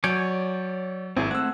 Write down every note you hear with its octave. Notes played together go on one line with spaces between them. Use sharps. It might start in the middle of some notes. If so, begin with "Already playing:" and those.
F#3 C#5 D5 G#5 G6 D7
G#1 C4 E4 G#4
A3 C4 F#5 E6 G#6